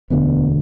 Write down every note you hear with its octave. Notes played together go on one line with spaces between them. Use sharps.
E1 D2 D3 B3